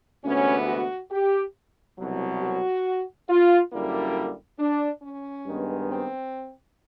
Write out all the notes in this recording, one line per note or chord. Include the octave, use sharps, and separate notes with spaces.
D2 C3 E3 G#3 B3 C#4
F#4
G4
C2 B2 F#3
F#4
F4
F#2 D3 G3 A#3 E4
D4
C#4
G2 D#3 G#3 B3
C4